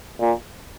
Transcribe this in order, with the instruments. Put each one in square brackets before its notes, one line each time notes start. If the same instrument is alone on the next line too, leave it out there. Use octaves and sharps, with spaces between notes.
[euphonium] A#2